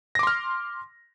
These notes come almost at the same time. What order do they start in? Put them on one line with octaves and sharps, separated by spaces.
A#6 D6 C6 F6